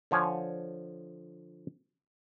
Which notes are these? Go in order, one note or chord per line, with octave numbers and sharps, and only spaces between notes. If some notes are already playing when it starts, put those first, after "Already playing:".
D3 F3 C#5 G#5